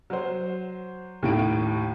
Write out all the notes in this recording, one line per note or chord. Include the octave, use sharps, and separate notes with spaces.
F#3 C5
D#2 A2 D7